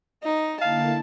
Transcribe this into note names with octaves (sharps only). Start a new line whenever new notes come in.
D#4
D3 A#3 E4 F5 A5